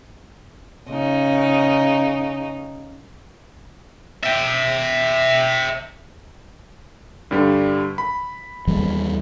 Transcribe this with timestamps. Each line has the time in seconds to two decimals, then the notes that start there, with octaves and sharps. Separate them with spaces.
0.89 C#3 D#4
4.23 E5 G5
7.31 G2 D3 G3
7.98 B5
8.67 D#2 E3 G3